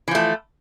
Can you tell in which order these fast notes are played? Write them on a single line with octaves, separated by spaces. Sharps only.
E3 F3 A3